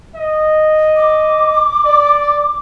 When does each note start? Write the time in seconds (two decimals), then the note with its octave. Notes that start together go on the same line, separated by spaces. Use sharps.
0.15 D#5
0.96 D6
1.85 D5